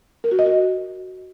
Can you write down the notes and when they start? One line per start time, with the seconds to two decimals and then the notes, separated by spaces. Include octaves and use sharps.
0.24 A#4
0.31 F#4
0.39 D#5
0.46 F#4